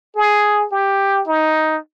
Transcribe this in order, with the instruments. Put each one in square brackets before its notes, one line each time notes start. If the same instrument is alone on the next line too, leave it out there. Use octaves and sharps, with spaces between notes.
[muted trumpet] G#4
G4
D#4